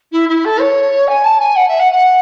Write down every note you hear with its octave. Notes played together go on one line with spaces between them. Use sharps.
E4
E4
A4
C#5
G#5
A5
G#5
F#5
E5
F#5
F#5